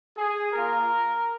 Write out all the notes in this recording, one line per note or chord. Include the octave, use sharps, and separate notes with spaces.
G#4
A#3 F4 A#4